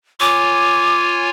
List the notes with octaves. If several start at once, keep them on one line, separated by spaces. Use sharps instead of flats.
F4 C#5 G#5 D6